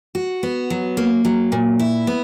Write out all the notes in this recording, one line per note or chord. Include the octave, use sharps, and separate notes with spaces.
F#4
B3
F#3
A#3
F#3
A#2
E4
B3